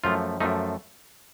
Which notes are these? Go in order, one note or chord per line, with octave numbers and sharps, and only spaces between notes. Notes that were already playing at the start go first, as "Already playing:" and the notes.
F#2 F3 A3 F4
F#2 F3 A3 D#4